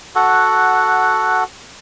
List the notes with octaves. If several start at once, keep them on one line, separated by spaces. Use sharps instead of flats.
F#4 A4 F#5